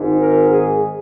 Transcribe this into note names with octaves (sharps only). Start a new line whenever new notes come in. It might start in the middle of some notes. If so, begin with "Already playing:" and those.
Already playing: G#1 G#2 D#3
A#4
G#4